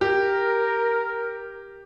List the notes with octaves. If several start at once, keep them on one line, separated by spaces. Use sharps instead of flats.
G4 A#4